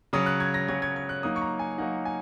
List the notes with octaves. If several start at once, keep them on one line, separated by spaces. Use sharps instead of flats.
C#3 F#3 C#4 D#6
F#6
G#6
A#6
C#3 F#3 C#4 G#6
G#6
G#6
F#6
F#3 A#3 D#4 D#6
C#6
A#5
G#5
F#3 A#3 D#4 F#5
G#5